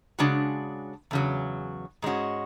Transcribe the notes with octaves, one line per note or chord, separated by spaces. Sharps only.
C#3 G#3 D4 F#4
E2 C#3 F#3
G#2 G#3 C#4 F#4